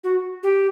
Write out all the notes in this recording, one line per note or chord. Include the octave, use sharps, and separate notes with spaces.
F#4
G4